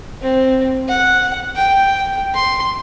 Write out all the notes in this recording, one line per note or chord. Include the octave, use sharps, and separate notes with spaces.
C4
F#5
G5
C6